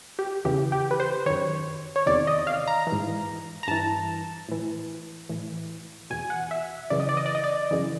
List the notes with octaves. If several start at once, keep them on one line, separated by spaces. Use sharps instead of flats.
G4
E2 C#3 E3 G4
G4
B4
C5
F#2 D#3 C#5
C#5
E2 C3 D#3 D5
D#5
F5
A#5
E3
G#2
A#5
G2 E3 A5
A2 E3
A2 E3
E2 B2 G#5
F#5
E5
F#2 C#3 E3 D5
D#5
D5
D#5
D5
D#5
D5
F#2 C#3 E3